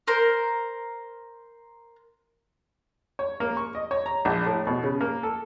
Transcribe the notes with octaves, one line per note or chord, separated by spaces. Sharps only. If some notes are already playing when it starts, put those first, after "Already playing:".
A#4 C5
C#5
A#3
C#6
D#5
C#5
A#5
A#1
A2
B2
C#3
A#3
A4